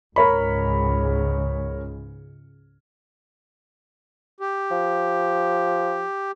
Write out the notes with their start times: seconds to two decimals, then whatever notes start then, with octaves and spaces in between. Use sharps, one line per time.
0.16 C#2 G#2 C#3 A#4 C#5 B5
4.40 G4
4.71 F3